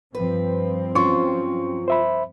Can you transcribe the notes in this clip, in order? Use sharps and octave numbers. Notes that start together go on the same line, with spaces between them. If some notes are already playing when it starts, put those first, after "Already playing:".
G2 F3 C4 B4
F#3 C#4 F4 C6 C#6
C5 E5 B5